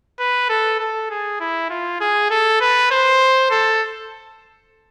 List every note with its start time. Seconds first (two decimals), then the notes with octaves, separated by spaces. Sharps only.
0.20 B4
0.49 A4
0.80 A4
1.10 G#4
1.40 E4
1.70 F4
2.01 G#4
2.30 A4
2.61 B4
2.91 C5
3.51 A4